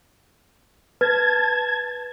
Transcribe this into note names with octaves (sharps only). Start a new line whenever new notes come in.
B4 A5 G#6